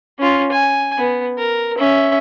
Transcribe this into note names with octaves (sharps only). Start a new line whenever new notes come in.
C#4 F4
G#5
B3
A#4
C#4 E5